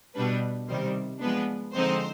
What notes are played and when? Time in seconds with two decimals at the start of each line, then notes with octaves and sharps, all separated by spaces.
0.15 B2 G3 D4 B4
0.68 C3 D#3 G3 C5
1.20 F3 G#3 B3 D4 B4
1.73 D3 F3 G#3 C4 D#4 C5